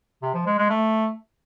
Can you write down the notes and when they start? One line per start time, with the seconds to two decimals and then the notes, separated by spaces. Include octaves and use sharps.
0.22 C3
0.34 F3
0.46 G#3
0.58 G#3
0.70 A3